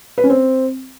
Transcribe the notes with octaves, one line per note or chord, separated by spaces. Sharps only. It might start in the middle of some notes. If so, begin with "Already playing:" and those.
B4
C#4
C4